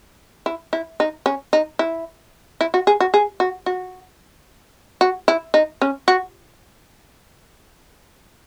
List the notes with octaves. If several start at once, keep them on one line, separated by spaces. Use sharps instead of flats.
E4
E4
D#4
C#4
D#4
E4
E4
F#4
G#4
F#4
G#4
F#4
F#4
F#4
E4
D#4
C#4
F#4